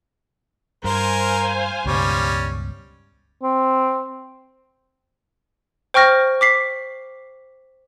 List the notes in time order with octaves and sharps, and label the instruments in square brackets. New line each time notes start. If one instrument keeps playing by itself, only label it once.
[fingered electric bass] G2 [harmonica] A#4 [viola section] C5 F5 G#5
[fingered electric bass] C#2 G2 B2 [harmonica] G3 C#4
[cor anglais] C4
[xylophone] C5 G5 C#6 F6 A#6
D6 B6 C7